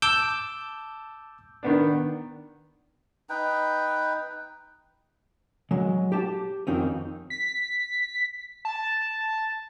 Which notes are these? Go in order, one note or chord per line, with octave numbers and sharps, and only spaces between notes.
A5 D6 E6 G6
D#3 B3 D4
D#4 B4 G5
F#3 G#3
G4 A5
F2 D#3 C4 C#4
B6
A5